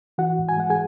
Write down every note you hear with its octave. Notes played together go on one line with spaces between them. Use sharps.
E3 F#4 F#5
G#2
G#5
G#3 F#5
G#4 G#5